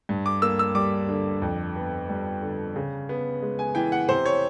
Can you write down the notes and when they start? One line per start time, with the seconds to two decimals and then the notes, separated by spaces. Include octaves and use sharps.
0.09 G2
0.26 D6
0.42 A#3 E6
0.59 E6
0.75 G3 D6
1.09 D3
1.42 F2
1.76 B3
2.09 G3
2.42 D3
2.76 C#3
3.09 B3
3.42 G#3
3.59 G#5
3.75 E3 G5
3.92 F#5
4.09 C3 C5
4.25 C#5